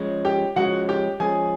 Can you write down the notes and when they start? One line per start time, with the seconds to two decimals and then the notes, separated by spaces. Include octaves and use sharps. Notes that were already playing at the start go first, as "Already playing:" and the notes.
Already playing: F3 G#3 C#4
0.25 G4 G5
0.56 F3 G#3 C#4 F#4 F#5
0.89 G4 G5
1.20 F3 G#3 C#4 G#4 G#5